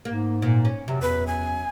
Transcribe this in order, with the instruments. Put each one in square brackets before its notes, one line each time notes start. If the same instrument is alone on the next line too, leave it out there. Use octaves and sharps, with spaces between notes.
[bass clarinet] G#2 [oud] A#3
[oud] A#2
C#4
[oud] F#2 [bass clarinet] C3
[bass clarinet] E2 [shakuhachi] B4
[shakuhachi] G#5